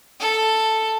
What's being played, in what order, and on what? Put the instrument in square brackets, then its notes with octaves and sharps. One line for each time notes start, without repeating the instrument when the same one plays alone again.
[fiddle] A4